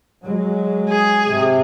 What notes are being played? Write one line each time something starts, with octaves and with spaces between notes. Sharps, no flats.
F#3 G#3
G#4
G#2 C3